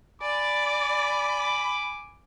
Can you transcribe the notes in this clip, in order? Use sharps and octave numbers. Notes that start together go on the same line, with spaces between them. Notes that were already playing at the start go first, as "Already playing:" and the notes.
D5 G#5 B5 D6